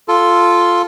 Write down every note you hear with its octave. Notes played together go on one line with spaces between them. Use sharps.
F4 A4